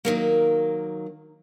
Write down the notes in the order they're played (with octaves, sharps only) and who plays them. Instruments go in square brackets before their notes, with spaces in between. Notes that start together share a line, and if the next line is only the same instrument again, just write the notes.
[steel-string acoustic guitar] D#3 F#3 A#3